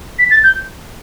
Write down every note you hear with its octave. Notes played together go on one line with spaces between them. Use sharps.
B6
A6
G6